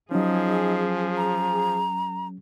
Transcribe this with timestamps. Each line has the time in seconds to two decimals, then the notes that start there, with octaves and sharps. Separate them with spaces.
0.11 F3 F#3 C#4 D#4 G#4
1.17 A#5